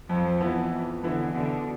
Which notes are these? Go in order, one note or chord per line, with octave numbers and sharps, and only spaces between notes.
F2 F3
E3 B3 E4
F2
D3 E3 B3 E4
B2 D3